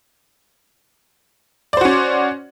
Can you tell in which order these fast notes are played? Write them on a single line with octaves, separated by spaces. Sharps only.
D5 C5 F#4 C#4